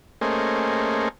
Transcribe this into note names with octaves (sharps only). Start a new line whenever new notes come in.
A3 A#3 C#4 G#4 C5 D#5